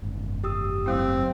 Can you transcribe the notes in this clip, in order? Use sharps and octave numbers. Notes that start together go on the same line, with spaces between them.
F#1 G#2
G4 D#6 E6
F#3 A3 C4 E4